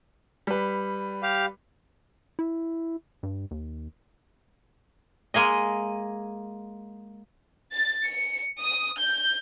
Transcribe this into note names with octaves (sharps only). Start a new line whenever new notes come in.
G3 B4
G4 F5
E4
G2
D#2
G#3 A#3 G#4 D#5
A6
C#7
D#6
G6